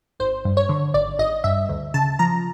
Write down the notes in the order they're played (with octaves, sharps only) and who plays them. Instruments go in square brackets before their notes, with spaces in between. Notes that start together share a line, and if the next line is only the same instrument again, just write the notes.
[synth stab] G#1 C5
G2
C#5
D3
G#1 D5
G#1 D#5
G2 E5
D2
C#3 A5
F3 A#5